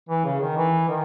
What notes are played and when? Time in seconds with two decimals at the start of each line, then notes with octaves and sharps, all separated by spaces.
0.09 E3
0.25 C#3
0.41 D#3
0.57 E3
0.88 D#3